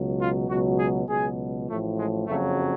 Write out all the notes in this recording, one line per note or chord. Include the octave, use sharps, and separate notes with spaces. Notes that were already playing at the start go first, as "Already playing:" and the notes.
Already playing: C#2 B2 F#3
F4
C#2 B2 F#3 F#4
G#4
C#2 B2 F#3 G#4
A1 A2 F3 A3
G#3
F#1 F2 C#3 F#3 A3